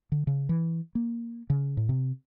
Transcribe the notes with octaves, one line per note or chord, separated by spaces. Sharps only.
D3
C#3
E3
A#3
C#3
A2
C3